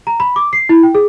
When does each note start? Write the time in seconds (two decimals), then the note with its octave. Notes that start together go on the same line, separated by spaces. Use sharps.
0.07 A#5
0.20 B5
0.36 D6
0.53 C7
0.69 E4
0.83 G5
0.95 G#4